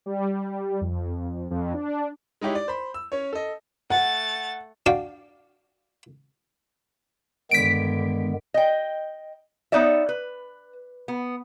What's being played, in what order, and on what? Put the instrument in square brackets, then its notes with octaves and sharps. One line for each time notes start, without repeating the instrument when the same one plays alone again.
[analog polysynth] G3
F2
F2
D4
[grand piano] G#3 D#4 E4 G4 C#5
D5
C5 B5
E6
C#4 C#5
A4 D#5
[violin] A3 A6 [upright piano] F#5
[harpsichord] D4 F#4 D5 F5 G5
[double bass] G2 D3 [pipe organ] D#3 G#3 B3 [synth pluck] B6 D7
[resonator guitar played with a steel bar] D#5 G5
B3 D#4 C#5 D5 E5
B4
B3